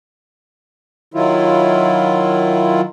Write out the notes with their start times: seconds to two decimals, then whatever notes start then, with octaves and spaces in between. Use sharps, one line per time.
1.14 D#3 F#3 E4 F4